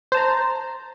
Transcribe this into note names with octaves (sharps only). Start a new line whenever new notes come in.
C5 A5 A#5